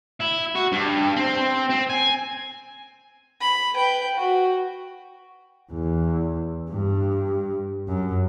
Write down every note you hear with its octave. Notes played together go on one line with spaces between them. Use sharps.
E4
F#4
G2
C4
C4
G#5
B5
B4 G5
F#4
E2
G2
F#2